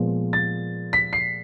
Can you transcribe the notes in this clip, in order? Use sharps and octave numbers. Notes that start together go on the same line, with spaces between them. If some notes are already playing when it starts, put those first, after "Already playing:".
Already playing: A#2 F3 G#3 B3
A6
B6
C7